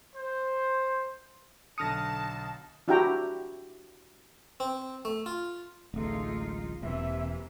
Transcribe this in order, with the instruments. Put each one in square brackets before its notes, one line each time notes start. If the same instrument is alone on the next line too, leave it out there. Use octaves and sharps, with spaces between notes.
[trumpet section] C5
[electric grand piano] B1 D3 C#7 [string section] A5 [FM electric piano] D#6 F6 A#6
[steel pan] D4 E4 F#4 G4 G5 A#5
[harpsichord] C4
A3
F4
[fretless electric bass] D1 A1 [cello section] G#3 D#4 F4 [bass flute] A3
[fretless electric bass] E1 [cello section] C3 E3 A#3 [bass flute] E5